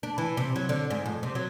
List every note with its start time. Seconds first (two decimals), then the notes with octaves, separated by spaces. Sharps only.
0.03 D4
0.18 E3
0.37 C3
0.56 F#3
0.69 D3
0.91 G#2
1.06 F2
1.23 C3
1.35 F#3